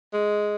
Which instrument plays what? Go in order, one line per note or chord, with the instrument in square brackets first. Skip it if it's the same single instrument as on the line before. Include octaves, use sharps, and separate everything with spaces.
[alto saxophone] G#3